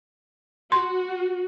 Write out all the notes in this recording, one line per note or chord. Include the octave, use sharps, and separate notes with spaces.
F#4 C6